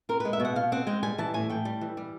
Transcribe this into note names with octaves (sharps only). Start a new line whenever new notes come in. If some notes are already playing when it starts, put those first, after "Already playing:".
C4 A#4
G#3 B4
E5
B2
F#5
B2 F5
C4 F#5
G#3 G5
G3 G#5
E3 A5
A2 G#5
A2 G5
G3
E3
G3